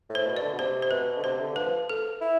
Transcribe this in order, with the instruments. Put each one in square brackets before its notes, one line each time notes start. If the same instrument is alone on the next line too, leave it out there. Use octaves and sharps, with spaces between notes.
[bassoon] A2
[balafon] C5
[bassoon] B2
[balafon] D5
[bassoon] D3
B2
[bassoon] C3 [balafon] C5
[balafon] C5
[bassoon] B2 [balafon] B4
[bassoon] D3
[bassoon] C3 [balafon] C5
[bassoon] D3
[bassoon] F3 [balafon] B4
[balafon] A4
[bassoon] E4